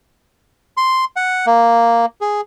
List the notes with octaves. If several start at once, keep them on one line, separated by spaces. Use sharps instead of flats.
C6
F#5
A#3
G#4